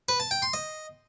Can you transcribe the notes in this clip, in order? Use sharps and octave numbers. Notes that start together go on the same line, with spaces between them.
B4
A5
G5
C6
D#5